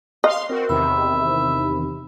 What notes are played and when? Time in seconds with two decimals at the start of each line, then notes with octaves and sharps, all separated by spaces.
0.24 D#5 F5 C6
0.49 C4 F#4 A#4
0.69 E2 C3 D#3 E5 B5